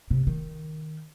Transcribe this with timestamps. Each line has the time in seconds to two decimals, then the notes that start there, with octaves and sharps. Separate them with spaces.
0.11 C3
0.27 D#3